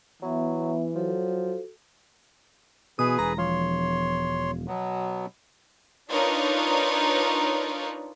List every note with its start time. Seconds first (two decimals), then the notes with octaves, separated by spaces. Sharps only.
0.22 E3 F#3 B3 E5
0.95 F3 F#3 F#4 A4
2.99 B2 E3 G#4 B4 D#6
3.19 E1 A#5
3.38 F3 C#5 C6
4.68 B2 F#3 B3
6.10 D4 D#4 F4 A#4 B4 C#5